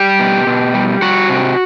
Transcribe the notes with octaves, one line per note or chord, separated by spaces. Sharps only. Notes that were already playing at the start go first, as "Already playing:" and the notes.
Already playing: G3 G4
B2
B2
G3
G3 F#4
C3